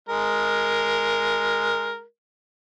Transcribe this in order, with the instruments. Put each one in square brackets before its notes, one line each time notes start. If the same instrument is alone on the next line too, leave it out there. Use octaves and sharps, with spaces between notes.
[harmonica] G#3 A#4